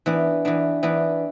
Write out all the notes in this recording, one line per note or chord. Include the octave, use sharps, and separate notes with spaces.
E3 B3 D4
E3 B3 D4
E3 B3 D4